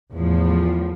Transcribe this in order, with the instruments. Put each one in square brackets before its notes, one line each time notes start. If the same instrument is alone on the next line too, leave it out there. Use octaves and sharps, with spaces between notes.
[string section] E2 A2 F3